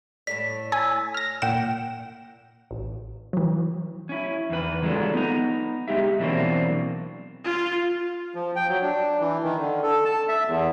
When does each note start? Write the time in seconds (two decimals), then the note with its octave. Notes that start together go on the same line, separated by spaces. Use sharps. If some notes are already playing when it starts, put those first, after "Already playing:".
0.27 A2 A4 D5 B6
0.72 G#5 E6
1.14 F6 A#6
1.42 A#2 F#5 G5 E7
2.71 A1
3.33 E3 F#3
4.09 C#4 E4
4.49 E2 D#3 B4
4.82 D#3 F#3 G#3 D4 F4 A4
5.14 B3 D#4 A#5
5.88 G#3 D#4 G4 E5
6.19 B2 E3 F#3 A#3 C4 D4
7.44 F4
8.35 F3
8.56 G5
8.69 F#3
8.82 D4
9.20 E3
9.43 D#3
9.59 D3
9.83 A4
10.05 A5
10.28 E5
10.48 E2